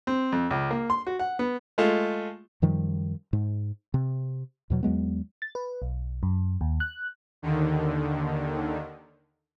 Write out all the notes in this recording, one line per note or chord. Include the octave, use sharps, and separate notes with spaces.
C4
F2
C#2
A#3
C6
F#4
F#5
B3
G#3 A3 F4
F#2 D#3 F3 G3
G#2
C3
E2 B2 F#3
E2 F#3 G#3 B3
A6
B4
B1
F#2
D#2
F#6
D#2 D3 D#3